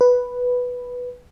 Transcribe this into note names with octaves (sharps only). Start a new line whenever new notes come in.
B4